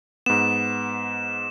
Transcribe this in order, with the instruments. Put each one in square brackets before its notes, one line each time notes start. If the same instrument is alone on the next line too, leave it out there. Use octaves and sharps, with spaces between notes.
[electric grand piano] G#2 B3 [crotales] E7